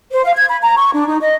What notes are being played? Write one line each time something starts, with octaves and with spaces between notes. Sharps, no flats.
C5
F5
G#6
B5
A#5
C#6
D4
D#4
D#5